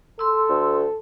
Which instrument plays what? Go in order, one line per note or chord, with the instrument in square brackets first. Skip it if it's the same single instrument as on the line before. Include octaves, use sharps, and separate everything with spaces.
[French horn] A4 [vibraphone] C6 E6
[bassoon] D2